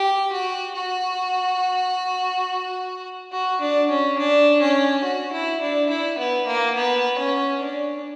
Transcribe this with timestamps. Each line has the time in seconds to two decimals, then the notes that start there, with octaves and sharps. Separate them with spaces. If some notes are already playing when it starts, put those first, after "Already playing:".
Already playing: G4
0.32 F#4
0.75 F#4
3.32 F#4
3.61 D4
3.89 C#4
4.18 D4
4.61 C#4
5.04 F#4
5.32 E4
5.61 D4
5.90 E4
6.18 B3
6.47 A#3
6.75 B3
7.18 C#4
7.61 D4